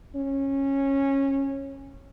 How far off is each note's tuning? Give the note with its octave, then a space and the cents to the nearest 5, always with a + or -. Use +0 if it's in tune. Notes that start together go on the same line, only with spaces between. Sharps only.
C#4 -15